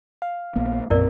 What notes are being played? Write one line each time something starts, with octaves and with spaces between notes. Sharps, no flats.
F5
A#1 A#3 B3
B1 F#2 A#2 C4 E4 A#4 D5